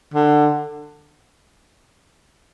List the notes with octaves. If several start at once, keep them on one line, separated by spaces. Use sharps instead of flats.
D3